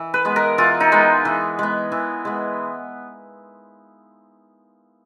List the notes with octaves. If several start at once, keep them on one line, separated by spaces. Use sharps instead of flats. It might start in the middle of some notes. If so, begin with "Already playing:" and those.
Already playing: E3
B4
G#3 B3
A#4
E3 F4
D#4
G#3 B3
E3
G#3 B3
E3
G#3 B3